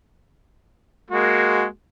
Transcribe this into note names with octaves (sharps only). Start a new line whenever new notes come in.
G#3 A#3 F#4